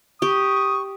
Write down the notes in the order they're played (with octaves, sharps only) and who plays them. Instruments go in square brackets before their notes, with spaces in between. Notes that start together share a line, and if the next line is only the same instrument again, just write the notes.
[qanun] G4 [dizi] C#6 [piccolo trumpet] D#6